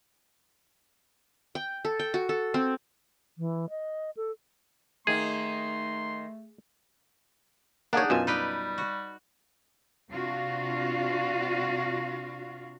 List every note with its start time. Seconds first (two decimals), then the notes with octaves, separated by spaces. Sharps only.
1.55 G5
1.85 A4
1.99 G5
2.14 F#4
2.29 A4
2.54 C4
3.38 E3
3.70 D#5
4.17 A4
5.07 D#3 A3 A#3 D#4 G#4 C6
7.93 A#3 D4 D#4 G#4 C#5 D5 F#5
8.10 F#2 B2 F4 G#5 E6
8.27 G3 D#4 B4 D5
8.78 F#4
10.11 C3 D4 F4 F#4 F5